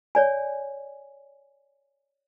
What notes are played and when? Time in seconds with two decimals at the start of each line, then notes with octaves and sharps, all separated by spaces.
0.15 C#5 D5 G#5